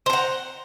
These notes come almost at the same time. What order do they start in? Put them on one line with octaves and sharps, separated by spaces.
C5 A#5 F#5